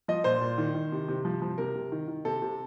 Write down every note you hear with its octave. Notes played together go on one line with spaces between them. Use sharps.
F3 D#5
A#2 C5
A#2
D#3
D#3
C3
C3
F3
F3
C3 A#4
C3
D#3
D#3
C3 A4
C3